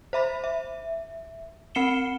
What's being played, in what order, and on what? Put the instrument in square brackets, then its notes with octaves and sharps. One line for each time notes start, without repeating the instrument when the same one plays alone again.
[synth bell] C5 E5 B5
E5
C4 F#5 C7 C#7 E7 G7